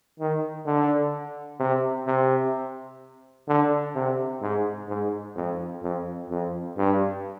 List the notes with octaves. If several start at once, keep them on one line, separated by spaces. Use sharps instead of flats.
D#3
D3
C3
C3
D3
C3
G#2
G#2
F2
F2
F2
G2